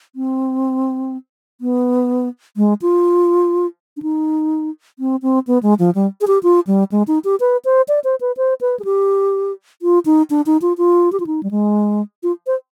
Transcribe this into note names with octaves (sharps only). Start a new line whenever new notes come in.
C4
B3
G#3
F4
D4
D#4
C4
C4
B3
G#3
F3
G3
G#4
G4
F4
G3
G#3
D#4
G4
B4
C5
D5
C5
B4
C5
B4
G#4
G4
F4
D#4
D4
D#4
F4
F4
G4
F4
D#4
G3
G#3
F4
C5